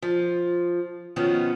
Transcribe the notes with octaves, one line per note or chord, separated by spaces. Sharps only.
F3
B2 D#3 F3 B3 C#4